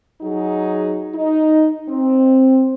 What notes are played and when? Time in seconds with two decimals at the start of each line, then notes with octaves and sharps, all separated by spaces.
0.22 F#3 D#4 F#4 G#4
1.14 D#4
1.89 C4